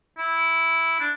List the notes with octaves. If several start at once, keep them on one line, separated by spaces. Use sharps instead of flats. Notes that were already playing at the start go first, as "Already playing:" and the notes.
E4
D4